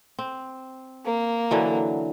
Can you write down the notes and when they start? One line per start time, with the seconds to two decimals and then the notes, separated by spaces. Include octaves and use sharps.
0.19 C4
1.05 A#3
1.51 D3 E3 F#3